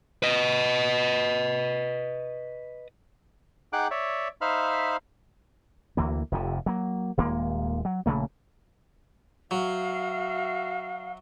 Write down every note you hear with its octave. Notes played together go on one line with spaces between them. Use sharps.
B4 D#5
D#4 G#4 F#5 G5 D6 F#6
C#5 D5 E5
D#4 C5 E5 F5 B5 F6
D2 E3 A#3
F1 F2 C3
F#3 A#3
D#1 D#2 G#3 A#3
F#3
A#1 C#3 A3 A#3
F#3 F#4 E5 F5